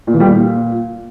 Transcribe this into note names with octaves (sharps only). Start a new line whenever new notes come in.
A#2
E3
G3
A#2